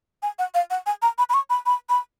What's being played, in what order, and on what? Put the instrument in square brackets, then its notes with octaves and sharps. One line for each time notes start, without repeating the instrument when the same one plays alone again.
[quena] G#5
F#5
F5
F#5
G#5
A#5
B5
B5
C#6
B5
B5
B5